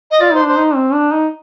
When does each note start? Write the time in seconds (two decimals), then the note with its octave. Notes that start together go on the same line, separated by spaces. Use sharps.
0.11 D#5
0.20 F4 D5
0.32 D#4 C5
0.44 D4 C5
0.57 D#4
0.75 C4
0.93 D4
1.12 D#4